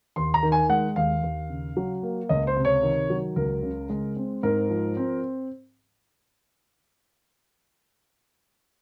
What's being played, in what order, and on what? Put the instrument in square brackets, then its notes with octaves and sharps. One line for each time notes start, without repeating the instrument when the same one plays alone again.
[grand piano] D#2 C6
A#5
D#3
G#5
G#3 F#5
D#2 F5
D#2
C#3
F#3
A#3
C#2 D#5
C5
C3
C#5
D#3
F#3
C#2 A#4
C#3
G#3
C4
G#2 A#4
F3
C4